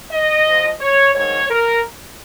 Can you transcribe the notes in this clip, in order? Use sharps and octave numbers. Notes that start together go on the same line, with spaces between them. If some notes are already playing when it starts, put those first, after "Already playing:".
D#5
G#2 F3
C#5
G#2 D#3 C#5
A#4